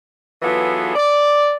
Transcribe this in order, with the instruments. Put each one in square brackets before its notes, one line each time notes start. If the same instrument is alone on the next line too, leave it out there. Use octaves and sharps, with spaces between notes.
[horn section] E3 F#3 B3 F4 G#4 A4
D5